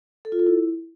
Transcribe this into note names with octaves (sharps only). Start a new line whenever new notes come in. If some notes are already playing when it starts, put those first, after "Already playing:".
A4
F4
A4
E4